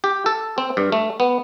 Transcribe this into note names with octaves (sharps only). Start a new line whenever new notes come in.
G4
A4
C4
G2
A3
B3